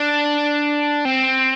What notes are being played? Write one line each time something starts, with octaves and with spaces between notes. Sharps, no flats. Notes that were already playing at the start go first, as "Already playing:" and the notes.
Already playing: D4
C4